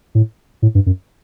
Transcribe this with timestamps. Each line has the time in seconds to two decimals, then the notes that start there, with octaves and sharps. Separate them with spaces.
0.15 A2
0.62 A2
0.75 G2
0.86 F#2